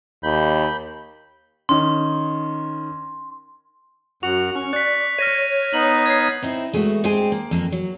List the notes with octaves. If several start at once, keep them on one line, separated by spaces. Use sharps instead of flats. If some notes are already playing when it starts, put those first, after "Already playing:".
D#2 B5 G6
D#3 C#4 C6
F#2 F#4 F#5 F7
C#4 C#6
D5 F#6 B6
C#5 F6 A#6 D#7
B3 D#4 F#7
G#6 C7
C4 D#4 E4
G#3 A3 B3 D4 F#4
G2 G#3 C4 G4 C5 G#5
A#3
F2 A#3 A4
F#3